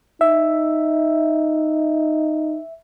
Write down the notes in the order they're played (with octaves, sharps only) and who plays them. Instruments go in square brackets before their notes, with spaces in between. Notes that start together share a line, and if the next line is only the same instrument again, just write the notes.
[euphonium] D#4 [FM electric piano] E5